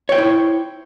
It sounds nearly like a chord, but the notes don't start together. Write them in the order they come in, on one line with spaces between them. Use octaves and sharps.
C#5 G5 C5 E4